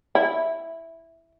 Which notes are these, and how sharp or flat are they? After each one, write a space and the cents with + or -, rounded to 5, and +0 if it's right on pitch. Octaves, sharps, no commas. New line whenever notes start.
E4 +0